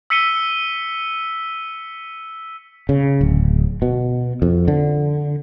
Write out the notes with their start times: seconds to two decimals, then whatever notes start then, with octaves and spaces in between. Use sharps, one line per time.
0.10 E6 B6 C#7 D#7 G7
2.89 C#3
3.21 D1
3.82 B2
4.42 F2
4.68 D3